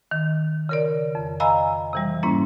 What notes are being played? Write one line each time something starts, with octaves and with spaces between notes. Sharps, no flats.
D#3
C#3 A#4 D5
F2
D#5 F5 G#5 A#5 B5 E6
C3 E3 G3
G#2 A#3 C#4 E4